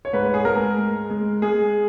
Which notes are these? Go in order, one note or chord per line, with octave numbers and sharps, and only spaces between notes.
C#5
G#2 B4
G#4
G#3 A#4
G#3
G#3
G#3 G#4